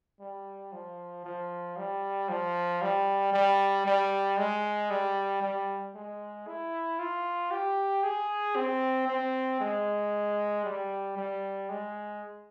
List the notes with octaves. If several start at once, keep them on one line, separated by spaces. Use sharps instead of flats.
G3
F3
F3
G3
F3
G3
G3
G3
G#3
G3
G3
G#3
E4
F4
G4
G#4
C4
C4
G#3
G3
G3
G#3